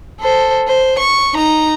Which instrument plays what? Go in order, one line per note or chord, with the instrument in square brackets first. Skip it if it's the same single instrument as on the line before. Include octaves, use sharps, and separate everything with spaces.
[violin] A4 C5
C5
C#6
D#4 A#5